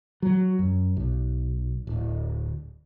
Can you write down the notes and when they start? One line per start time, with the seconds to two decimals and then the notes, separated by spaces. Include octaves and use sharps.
0.22 F#3
0.59 F#2
0.97 B1
1.87 D1